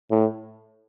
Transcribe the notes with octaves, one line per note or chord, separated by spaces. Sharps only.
A2